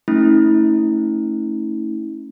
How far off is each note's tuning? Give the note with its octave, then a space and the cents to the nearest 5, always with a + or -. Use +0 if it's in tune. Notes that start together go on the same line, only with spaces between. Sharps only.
A3 +15 C#4 +0 E4 -35